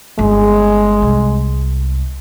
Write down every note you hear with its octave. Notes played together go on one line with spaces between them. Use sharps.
G1 G#3
C2